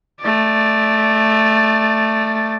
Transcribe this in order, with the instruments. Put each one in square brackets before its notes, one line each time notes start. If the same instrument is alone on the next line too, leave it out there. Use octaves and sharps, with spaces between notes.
[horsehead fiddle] A3 D5